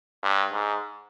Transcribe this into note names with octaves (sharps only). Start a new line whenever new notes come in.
G2
G#2